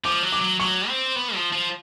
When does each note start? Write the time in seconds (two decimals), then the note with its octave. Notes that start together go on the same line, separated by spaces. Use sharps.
0.04 F3 D6
0.23 F#3
0.32 D6
0.41 F#3
0.60 F#3 C#6
0.88 C4
1.16 B3
1.35 F3
1.53 F3